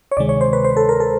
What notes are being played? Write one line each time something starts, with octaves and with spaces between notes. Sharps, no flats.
C#5
D2 C3 D#3 G#3 D5
C#5
C5
B4
C5
A4
A#4
A4